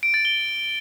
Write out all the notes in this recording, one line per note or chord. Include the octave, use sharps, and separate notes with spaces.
D7
A6
G7